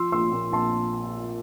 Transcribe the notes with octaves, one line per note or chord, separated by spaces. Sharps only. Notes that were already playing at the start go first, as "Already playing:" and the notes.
Already playing: F3 C6 E6
A#1 C6 E6
A#2
A#1 A5 C6